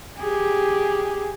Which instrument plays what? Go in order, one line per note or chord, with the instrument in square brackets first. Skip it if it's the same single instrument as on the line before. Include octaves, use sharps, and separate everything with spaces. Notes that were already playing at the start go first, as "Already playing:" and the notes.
[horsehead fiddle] G4 G#4